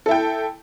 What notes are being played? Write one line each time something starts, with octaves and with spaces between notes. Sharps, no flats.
E4 A4 G5